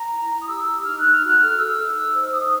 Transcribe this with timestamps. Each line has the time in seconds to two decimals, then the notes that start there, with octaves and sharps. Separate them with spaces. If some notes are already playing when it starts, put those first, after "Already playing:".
Already playing: A#5
0.09 E4
0.29 E4
0.41 D#6
0.46 G4 E6
0.66 G4
0.84 D#4 F6
0.98 F#6
1.03 D#4
1.11 F6
1.22 F#4 F#6
1.38 A4 F6
1.58 A4 E6
1.77 D#4
1.95 D#4
2.13 C5
2.33 D#4 D#6